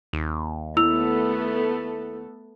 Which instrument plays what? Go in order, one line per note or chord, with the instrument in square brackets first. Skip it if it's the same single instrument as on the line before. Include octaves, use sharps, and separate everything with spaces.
[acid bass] D#2
[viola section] A3 B3 A4 [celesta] E4 E6 F7